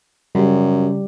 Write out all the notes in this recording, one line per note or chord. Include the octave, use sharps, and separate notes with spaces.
F#2 C#3 G3 G4